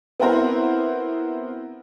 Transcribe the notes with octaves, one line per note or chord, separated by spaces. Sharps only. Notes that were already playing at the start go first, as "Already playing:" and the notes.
B3 C4 E4 F#4 A#4 C5